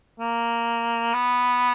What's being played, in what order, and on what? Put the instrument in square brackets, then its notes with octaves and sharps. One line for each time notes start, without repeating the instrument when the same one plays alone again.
[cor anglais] A#3
B3